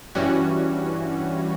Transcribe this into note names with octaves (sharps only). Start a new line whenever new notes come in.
G2 E3 G3 C#4 F#4